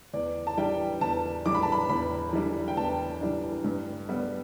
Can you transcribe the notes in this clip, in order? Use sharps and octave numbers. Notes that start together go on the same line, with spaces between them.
E2 D5
A5
E3 G3 D4 G5
E2 A5
E3 G3 D4 D6
B5
A5
B5
E2 B5
E3 G3 D4
G5
E2 A5
E3 G3 D4
G2
G3 B3